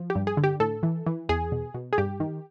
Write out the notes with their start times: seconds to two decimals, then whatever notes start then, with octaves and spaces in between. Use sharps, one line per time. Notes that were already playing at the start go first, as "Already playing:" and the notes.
Already playing: F3
0.10 G4
0.15 G2
0.27 G#4
0.37 D3
0.44 G4
0.60 A2 A4
0.83 E3
1.06 E3
1.29 E2 G#4
1.52 B2
1.74 B2
1.93 G#4
1.98 G2 G4
2.20 D#3